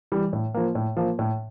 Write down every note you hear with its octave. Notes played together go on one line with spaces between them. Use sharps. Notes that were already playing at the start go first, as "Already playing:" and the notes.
E3 G3
A2
F3 A#3
A2
F3 A#3
A2